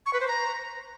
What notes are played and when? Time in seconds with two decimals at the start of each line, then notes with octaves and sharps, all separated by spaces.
0.06 C#6
0.13 B4
0.21 C5
0.28 A#5